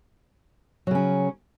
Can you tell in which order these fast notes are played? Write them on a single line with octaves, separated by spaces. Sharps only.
F#3 C#3 C#4